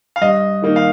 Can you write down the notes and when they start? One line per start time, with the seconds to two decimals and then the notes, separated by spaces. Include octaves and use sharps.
0.16 F5
0.22 G2 D#5
0.62 D#3 A#3 D#4
0.76 F5